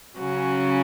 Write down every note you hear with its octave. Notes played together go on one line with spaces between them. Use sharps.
C#3 F#3 C#4 F#4